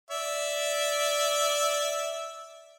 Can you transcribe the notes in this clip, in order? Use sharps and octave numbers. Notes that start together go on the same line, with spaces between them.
D5 E5